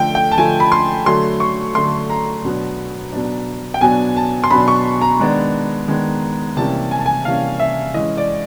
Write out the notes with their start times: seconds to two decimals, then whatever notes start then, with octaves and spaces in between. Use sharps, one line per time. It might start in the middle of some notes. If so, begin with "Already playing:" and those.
Already playing: D3 F3 A3 G5
0.15 G5
0.32 A5
0.37 D3 F3 A3 G#5
0.60 B5
0.72 C6
1.06 D3 F#3 A3 C6
1.40 C#6
1.75 D3 F#3 A3 C6
2.10 A#5
2.44 B2 F#3 B3 D4
3.12 B2 F#3 B3 D4
3.74 G5
3.81 B2 F#3 B3 D4 G#5
4.16 A5
4.44 C6
4.51 B2 F#3 B3 D4 B5
4.68 C#6
5.02 A#5
5.19 D#3 G#3 B3 D4
5.88 D#3 G#3 B3 D4
6.57 C3 E3 G3 A#3 C#4 A5
6.91 G#5
6.99 A5
7.06 G#5
7.25 C3 E3 G3 A#3 C#4 F5
7.60 E5
7.94 E3 G#3 C#4 D#5
8.17 D5